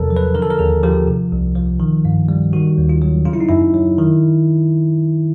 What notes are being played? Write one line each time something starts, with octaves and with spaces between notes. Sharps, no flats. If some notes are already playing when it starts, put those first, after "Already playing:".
Already playing: E2 C3 F#3 A4 A#4
F3
B4
D3 A#4
A4
A#4
D#2 G#4
F3 G4
C3
C2
F3
D#3
G2
G3
D#3 F#4
D#2
F4
F#3
C#3 F4
E4
D#4
F#2 E4
F#3
D#3